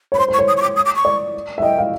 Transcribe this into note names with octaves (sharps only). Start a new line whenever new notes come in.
C#5
B5
C5 C6
C5
C#6
C#5
D#6
C#6
D6
D#6
D6
C#6
D5
E5
D#5 G5
F5